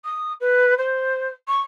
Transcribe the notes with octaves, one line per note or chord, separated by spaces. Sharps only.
D#6
B4
C5
C#6